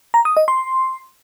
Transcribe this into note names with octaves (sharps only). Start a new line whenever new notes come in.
A#5
D#6
D#5
C6